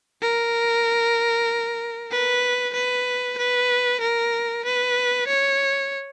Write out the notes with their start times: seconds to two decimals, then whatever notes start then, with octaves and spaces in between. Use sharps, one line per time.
0.22 A#4
2.11 B4
2.74 B4
3.38 B4
4.01 A#4
4.65 B4
5.28 C#5